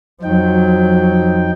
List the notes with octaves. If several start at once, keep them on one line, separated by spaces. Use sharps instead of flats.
F2 F3 F#3 D#4 G5